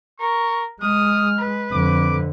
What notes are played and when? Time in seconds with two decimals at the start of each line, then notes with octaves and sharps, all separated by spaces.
0.20 A#4 C#6
0.82 G#3 D#6 F6
1.39 B4
1.73 F2 D3 D6